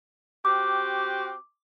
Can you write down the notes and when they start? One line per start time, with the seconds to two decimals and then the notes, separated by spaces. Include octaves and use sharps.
0.45 C4 F#4 G4 D6